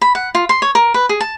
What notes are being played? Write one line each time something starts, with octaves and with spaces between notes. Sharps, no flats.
B5
F#5
F4
C6
C#5
A#4
B4
G#4
A5